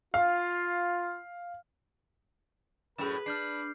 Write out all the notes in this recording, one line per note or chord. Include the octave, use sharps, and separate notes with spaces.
F4 F5
F#2 A2 G#4 B4 E7
D4 F6 G6 C7